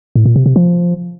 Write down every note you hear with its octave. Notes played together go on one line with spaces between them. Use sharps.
A2
A#2
C3
C3
F3